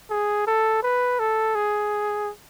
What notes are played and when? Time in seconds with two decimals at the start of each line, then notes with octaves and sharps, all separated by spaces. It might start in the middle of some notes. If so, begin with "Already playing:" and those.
0.11 G#4
0.47 A4
0.83 B4
1.19 A4
1.55 G#4